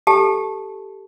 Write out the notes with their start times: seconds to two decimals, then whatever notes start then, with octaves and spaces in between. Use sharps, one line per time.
0.07 G4 A4 A5